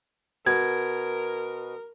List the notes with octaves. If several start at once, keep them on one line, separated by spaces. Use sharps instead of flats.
B2 A#4 G#6